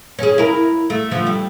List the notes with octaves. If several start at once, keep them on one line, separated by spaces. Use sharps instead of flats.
C#4 G#4
E4 A#4
A3
D3 F3 A3
G3